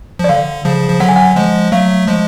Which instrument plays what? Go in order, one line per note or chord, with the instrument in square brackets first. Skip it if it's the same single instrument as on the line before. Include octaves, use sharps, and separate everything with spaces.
[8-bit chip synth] F3
[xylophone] D5
[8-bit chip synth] D3 [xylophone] F5
[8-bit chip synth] C#3 F3
F3
[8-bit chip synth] D3 F#3 [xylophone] F#5
[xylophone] G#5
F#5
[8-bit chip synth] F3 G#3
[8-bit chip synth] F#3 A3 [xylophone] F5
[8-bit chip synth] F3 G#3